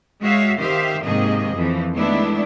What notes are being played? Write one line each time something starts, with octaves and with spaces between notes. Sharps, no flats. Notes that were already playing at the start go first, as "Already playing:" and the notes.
G#3 F#4 C#5 E5 F5
D#3 G4 C5 E5 F5
G#2 C3 D#3 A#3 G#4 D#5
F2 E3 F3
D#3 G#3 A3 B3 D4 E4